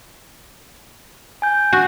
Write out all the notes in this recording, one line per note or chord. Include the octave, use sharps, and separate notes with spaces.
G#5 G6
F#4